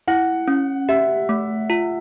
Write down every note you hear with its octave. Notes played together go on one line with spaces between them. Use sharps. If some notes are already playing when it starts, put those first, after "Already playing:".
E4 F#5
C#4
G4 E5
A3
F4